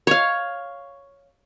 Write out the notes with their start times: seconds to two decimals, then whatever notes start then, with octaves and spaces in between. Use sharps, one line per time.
0.07 C#5 F5